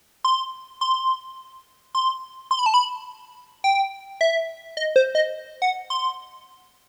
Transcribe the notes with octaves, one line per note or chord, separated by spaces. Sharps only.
C6
C6
C6
C6
B5
A5
B5
G5
E5
D#5
C5
D#5
F#5
C6